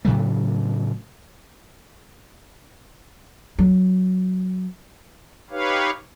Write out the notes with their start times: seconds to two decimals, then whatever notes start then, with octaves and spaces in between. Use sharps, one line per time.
0.05 A2 C#3 F#3 A3
3.59 F#3 C#4
5.51 D#4 G4 B4 C#5 F5